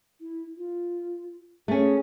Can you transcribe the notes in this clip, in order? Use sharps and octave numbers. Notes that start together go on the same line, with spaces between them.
E4
F4
A3 C#4 G#4